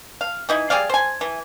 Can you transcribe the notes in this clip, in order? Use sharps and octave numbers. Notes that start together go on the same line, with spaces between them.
F5
E3 D#4 E4
G3 G#4 D5 F5
C5 G#5
E3